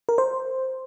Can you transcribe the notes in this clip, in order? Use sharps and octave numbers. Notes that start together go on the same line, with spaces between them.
A#4
C5